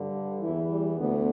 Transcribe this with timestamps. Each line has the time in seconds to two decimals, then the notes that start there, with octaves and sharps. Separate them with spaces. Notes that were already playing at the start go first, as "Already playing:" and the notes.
Already playing: G2 D3
0.40 E2 E3 E4
0.69 G3
0.97 D2 D3 B3